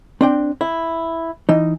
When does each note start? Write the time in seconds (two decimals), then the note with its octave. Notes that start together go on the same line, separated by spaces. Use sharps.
0.21 C4 D4 G5
0.61 E4
1.49 E3 D#4